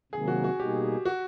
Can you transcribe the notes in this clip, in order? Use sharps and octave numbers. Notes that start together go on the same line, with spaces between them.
C3 D#3 F#3 A#3 G#4
F#4
F#4
B2 G3 A#3 D#4 G4 G#4
F#4